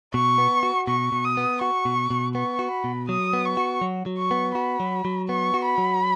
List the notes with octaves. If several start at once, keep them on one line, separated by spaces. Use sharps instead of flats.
B2 C#6
B3
F#4
B2 C#6
B2
D#6
B3
F#4 C#6
B2
B2
B3 C#6
F#4
B5
B2
F#3 D#6
B3
C#6
F#4
F#3
F#3
C#6
B3
F#4 B5
F#3
F#3
B3 C#6
F#4
B5
F#3